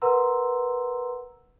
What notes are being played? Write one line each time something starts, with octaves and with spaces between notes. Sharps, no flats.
A#4 B4 F#5 A#5 C6 E6